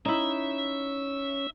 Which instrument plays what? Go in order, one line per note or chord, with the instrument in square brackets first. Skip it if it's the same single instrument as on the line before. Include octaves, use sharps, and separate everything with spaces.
[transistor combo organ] C#4 [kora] D#4 E4 [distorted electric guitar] E5